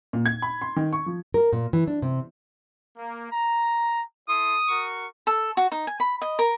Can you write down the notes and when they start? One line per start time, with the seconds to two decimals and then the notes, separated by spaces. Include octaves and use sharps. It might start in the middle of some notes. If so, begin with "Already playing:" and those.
0.13 A#2
0.26 G#6
0.42 B5
0.62 C6
0.76 D#3
0.93 C#6
1.06 F3
1.34 A#4
1.53 A#2
1.73 E3
1.88 D4
2.02 C3
2.98 A#3
3.31 A#5
4.28 E4 A4 C6 D#6
4.68 F#4 A#4 C#6
5.27 A4
5.57 F#4
5.72 D#4
5.87 G#5
6.00 B5
6.22 D#5
6.39 A#4